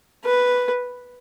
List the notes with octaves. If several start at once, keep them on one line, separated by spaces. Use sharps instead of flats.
B4